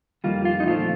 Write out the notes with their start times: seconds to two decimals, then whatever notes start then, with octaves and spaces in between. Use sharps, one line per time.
0.24 F2 D#3 G3 A#3 F4
0.45 F4
0.60 D#4
0.67 A#2 F3 A3 C4 F4